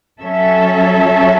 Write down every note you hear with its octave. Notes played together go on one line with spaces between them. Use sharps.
F#3 C#4 A4 E5